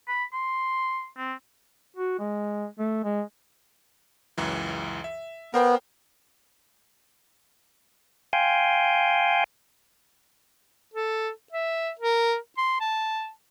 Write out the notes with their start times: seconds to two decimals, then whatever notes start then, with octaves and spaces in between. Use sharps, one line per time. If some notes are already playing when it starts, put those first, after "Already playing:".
0.08 B5
0.33 C6
1.18 C4
1.96 F#4
2.19 G#3
2.79 A3
3.04 G#3
4.38 C#2 F#2 E3
5.04 E5
5.54 B3 A#4 C5 G5
8.33 F5 G5 G#5 C6
10.93 A4
11.52 E5
11.99 A#4
12.58 C6
12.80 A5